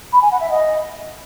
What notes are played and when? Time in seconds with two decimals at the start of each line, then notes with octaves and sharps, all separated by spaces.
0.13 B5
0.22 G#5
0.31 F#5
0.41 E5
0.50 D#5